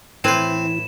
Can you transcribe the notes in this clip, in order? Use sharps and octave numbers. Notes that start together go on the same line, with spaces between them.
A2 E3 C4 E4 B4 C5 E7